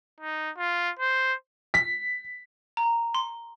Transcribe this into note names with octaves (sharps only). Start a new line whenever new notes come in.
D#4
F4
C5
B6
A#5
C6